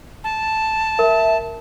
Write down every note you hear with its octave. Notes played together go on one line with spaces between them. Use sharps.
A5
A#4 E5